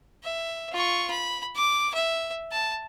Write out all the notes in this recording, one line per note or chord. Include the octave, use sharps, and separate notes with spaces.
E5
F4 C#6
B5
D6
E5
A5